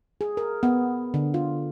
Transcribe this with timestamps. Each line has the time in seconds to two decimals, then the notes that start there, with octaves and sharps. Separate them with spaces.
0.21 G#4
0.37 A#4
0.63 B3
1.14 D3
1.34 F4